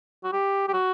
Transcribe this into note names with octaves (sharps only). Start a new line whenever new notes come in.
F#4
G4
G4
F#4